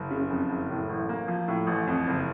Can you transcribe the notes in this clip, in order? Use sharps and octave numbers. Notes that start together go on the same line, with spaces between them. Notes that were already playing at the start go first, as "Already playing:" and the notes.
Already playing: F#1
C#3
F2
F#1
A2
A1
A#3
F3
A2
A1
F2
F#1